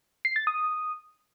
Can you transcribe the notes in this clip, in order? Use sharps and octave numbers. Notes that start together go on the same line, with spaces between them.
C7
A6
D#6